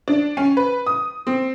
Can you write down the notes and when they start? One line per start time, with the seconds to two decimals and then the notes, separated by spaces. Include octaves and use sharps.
0.08 D4
0.37 C#4
0.57 B4
0.86 D#6
1.27 C4